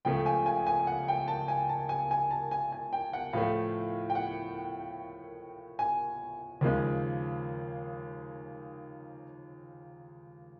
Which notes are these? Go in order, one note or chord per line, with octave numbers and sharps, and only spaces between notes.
C#2 C#3 F3 A3 G5
G#5
G#5
G#5
F#5
G5
A5
G#5
A5
G#5
G#5
A5
G#5
G#5
G5
F#5
A2 F3 A3 F5
G5
F#5
G#5
D#2 C#3 F3 G#3